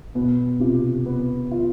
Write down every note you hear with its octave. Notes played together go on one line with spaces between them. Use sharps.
B2 B3
C3 F4
B3
F4